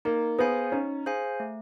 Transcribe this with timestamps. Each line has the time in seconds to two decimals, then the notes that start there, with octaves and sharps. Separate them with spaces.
0.05 A#3 D#4
0.39 B3 G#4 C5 F5 G#5
0.72 C#4 D#4
1.06 G#4 C5 F5 G#5
1.40 A3